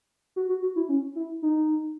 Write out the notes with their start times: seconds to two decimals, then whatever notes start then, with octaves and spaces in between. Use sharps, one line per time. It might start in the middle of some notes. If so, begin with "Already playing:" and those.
0.36 F#4
0.49 F#4
0.62 F#4
0.76 E4
0.89 C#4
1.16 E4
1.42 D#4